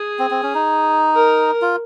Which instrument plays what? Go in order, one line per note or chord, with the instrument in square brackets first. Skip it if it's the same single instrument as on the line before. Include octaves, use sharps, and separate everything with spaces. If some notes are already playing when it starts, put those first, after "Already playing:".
Already playing: [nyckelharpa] G#4
[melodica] C4
C4
C#4
D#4
[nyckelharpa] A#4
[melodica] F4